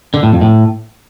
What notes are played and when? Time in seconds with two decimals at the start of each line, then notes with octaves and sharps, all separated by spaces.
0.14 D3
0.23 A2
0.32 F2
0.41 A2